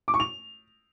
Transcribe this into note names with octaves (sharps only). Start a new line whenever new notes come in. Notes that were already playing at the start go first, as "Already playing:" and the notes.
D6
C#6
F7